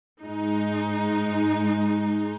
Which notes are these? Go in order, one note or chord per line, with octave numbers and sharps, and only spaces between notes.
G#2 G#3 D#4